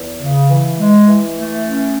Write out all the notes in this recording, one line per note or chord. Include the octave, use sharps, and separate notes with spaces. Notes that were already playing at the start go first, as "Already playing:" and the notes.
Already playing: E2
C#3
E3
G#3
E3
A3
C#4